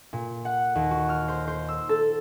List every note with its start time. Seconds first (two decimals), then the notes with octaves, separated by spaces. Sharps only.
0.13 A#2
0.45 F#5
0.75 D#2
0.91 F#4
1.09 F6
1.28 C5
1.48 C5
1.69 E6
1.89 A4